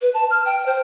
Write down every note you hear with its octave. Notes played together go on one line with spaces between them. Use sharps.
B4
A5
F6
G5
C5